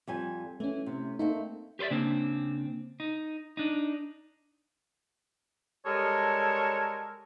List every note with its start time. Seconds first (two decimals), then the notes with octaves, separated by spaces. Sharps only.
0.07 F2 G3 G#5
0.60 E3 A3 C#4
0.86 C3
1.19 A3 A#3 C4 D#4
1.79 G4 B4 C5 D5 E5
1.91 C#3 A#3 C4 D4
3.00 D#4
3.57 D4 D#4
5.85 G3 G#3 A4 A#4 C#5